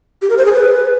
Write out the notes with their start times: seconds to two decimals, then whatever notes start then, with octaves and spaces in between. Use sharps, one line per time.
0.22 G4
0.30 A#4
0.38 C5
0.45 G#4
0.53 B4